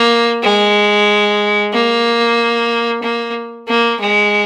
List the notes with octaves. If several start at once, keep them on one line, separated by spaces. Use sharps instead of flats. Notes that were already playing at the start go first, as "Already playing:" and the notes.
Already playing: A#3
G#3
A#3
A#3
A#3
G#3